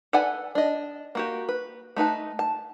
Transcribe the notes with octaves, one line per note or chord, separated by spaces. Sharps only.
A4 B4 D5 F#5 G#5
D4 D#5
A#3 F#4 G4
B4
A3 D#4 B4 A5
A5